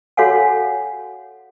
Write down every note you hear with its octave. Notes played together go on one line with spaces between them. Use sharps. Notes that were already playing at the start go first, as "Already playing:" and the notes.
F#4 A4 C#5 F5 F#5 G#5